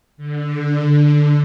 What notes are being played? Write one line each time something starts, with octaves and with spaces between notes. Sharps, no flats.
D3